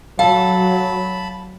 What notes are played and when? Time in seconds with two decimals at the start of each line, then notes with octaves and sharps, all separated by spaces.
0.19 F#3 A4 F5 A5 B5